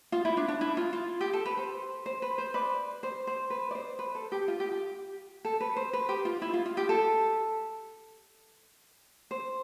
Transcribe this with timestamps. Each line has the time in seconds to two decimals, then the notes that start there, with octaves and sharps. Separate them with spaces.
0.12 F4
0.25 E4
0.37 D4
0.48 D4
0.61 E4
0.77 F4
0.93 F4
1.21 G4
1.33 A4
1.46 B4
1.57 C5
2.06 C5
2.22 B4
2.38 C5
2.54 B4 D5
3.03 C5
3.27 C5
3.50 B4
3.71 D5
3.75 C5
3.99 B4
4.15 A4
4.32 G4
4.48 F4
4.60 G4
4.72 G4
5.45 A4
5.61 B4
5.76 C5
5.93 B4
6.09 G4
6.25 F4
6.42 E4
6.54 F4
6.66 F4
6.77 G4
6.89 A4
9.31 C5